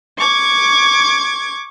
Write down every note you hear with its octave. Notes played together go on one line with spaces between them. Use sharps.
C#6 D6 G#6